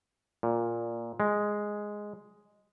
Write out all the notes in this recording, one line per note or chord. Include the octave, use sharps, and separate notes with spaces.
A#2
G#3